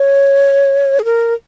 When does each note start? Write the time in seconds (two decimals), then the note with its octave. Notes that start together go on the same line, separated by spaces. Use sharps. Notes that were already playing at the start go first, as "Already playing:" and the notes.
Already playing: C#5
0.99 G#4
1.04 A#4